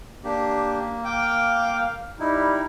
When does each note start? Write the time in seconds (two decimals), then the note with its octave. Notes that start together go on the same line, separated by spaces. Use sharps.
0.24 A#3 D4 G4
1.05 F5 G5 D6
2.20 G3 D#4 E4